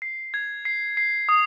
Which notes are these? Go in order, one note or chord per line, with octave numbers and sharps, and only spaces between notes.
C7
G#6
C7
C7
D#6